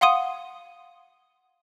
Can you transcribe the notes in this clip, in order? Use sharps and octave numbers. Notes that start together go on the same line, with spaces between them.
F5 F#5 C6 D#6 D#7